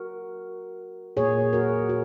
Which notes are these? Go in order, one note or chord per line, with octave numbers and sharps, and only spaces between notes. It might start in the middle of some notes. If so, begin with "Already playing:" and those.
Already playing: F#4 A#4
A#2 A#3 G#4 C#5
F#4 A#4
F#4